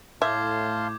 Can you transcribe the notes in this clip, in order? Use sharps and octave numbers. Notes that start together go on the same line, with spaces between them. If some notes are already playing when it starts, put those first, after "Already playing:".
A2 E5 F5 A5 C6 D6 G6 G#6